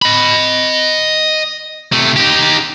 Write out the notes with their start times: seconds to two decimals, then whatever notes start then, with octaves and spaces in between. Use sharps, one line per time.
0.02 D#5 B5
1.93 C3 A3
2.16 D#4 G4